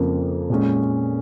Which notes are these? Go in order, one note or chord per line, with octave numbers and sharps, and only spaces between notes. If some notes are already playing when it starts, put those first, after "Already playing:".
Already playing: F2 C#3 F3 A#3
A#2 G#3 C#4